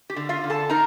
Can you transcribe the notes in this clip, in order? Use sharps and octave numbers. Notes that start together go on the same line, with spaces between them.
G4
D3
F4 F5
D3
A4 A5
D#4 A#4 A#5